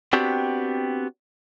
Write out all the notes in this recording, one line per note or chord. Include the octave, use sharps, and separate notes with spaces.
B3 C4 D4 F#4 G4